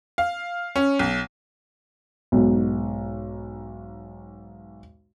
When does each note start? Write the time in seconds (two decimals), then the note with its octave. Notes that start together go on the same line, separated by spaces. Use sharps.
0.18 F5
0.76 C#4
0.99 B1
2.32 B1 G#2